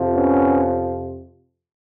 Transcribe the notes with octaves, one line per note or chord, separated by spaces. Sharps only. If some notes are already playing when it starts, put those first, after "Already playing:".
Already playing: F2 C3 F3
B3 C#4